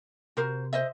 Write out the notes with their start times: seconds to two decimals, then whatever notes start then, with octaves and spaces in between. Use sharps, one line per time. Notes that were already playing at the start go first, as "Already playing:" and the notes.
0.37 C3 F#4 A#4 C5
0.73 C5 D#5 E5